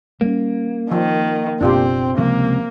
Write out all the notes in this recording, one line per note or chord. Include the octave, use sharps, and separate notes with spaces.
G3 G#3 A#3 C#4
D#3 F3
F#1 B2 C4 D4 F4 G4
C#2 C3 F3 A#3